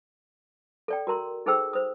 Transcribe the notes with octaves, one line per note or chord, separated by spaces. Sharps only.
A4 D5 G5
F#4 A#4 A#5 C6
D#4 G#4 A4 C5 G5 E6
C5 D#6